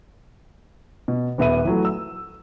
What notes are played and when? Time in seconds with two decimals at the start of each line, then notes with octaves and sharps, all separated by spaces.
1.08 B2
1.38 D#1 B3 E5 D#7
1.65 E3 F#3 A3
1.85 E6